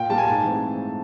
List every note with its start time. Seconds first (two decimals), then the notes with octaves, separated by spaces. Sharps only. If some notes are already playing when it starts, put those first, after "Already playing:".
Already playing: A#2 G5
0.10 G3 A#3 A5
0.18 G#5
0.25 G#2 A5
0.44 E3 A3 C4